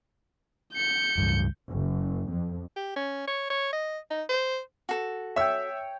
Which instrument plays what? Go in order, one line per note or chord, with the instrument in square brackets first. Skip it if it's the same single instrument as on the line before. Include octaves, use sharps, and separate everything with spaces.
[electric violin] G6 C#7
[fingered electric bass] C#2 G2
[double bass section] F#1
F2
[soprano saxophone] G4
C#4
C#5
C#5
D#5
D#4
C5
[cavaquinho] F#4 A4
[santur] C#5 G5 [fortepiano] E5 E6